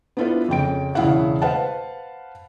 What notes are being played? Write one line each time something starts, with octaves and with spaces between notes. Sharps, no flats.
B3 D4 E4 F4 A4 B4
F2 C#3 G5 D7
E1 C#3 E4 F5 F#5
B4 C5 F5 F#5 A5